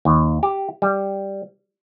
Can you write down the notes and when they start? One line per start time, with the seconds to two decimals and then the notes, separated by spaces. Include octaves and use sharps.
0.05 D#2
0.43 G4
0.82 G3